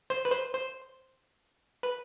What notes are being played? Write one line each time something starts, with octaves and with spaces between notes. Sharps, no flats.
C5
B4
C5
C5
B4